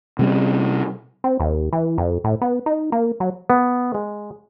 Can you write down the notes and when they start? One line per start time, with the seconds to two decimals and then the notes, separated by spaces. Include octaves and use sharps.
0.19 C3 G3 C#4
1.24 C4
1.40 D#2
1.73 E3
1.98 F2
2.24 A2
2.41 B3
2.66 D#4
2.92 A#3
3.20 F#3
3.50 B3
3.94 G#3